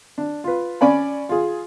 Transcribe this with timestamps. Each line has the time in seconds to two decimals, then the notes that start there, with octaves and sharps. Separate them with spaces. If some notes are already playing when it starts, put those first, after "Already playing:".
0.18 D4
0.44 F4 B4
0.81 C#4 D5 G#5 B5
1.29 F4 G#4